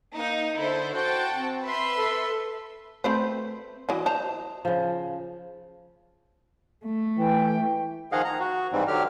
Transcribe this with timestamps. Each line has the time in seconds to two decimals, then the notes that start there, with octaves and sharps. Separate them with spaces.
0.14 A#3 D#4
0.56 D3 E4 A4 C5
0.93 F#4 C5 G5 A5
1.32 C4
1.64 B4 E5 C6
1.98 A4
3.04 A3 C4 B4 C5
3.89 E3 F#3 D#5
4.06 C5 A5 A#5
4.65 C#3 F3
6.85 A3
7.18 E3 G5
8.12 D#3 F3 G#4 D#5 F5 F#5
8.25 A#5
8.40 F#4
8.73 G#2 E3 G3 C4
8.88 D3 F#3 G4 F6